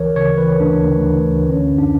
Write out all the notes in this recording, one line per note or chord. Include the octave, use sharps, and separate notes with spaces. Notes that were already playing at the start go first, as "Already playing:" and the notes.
Already playing: D2 E3 A#4 C#5
C#3 C#5
E3 B4
D2 D4
D2
E3
D2
D3 C#4
F#2
D4